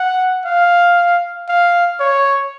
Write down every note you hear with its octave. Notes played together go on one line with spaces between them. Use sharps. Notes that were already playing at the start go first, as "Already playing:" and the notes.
Already playing: F#5
F5
F5
C#5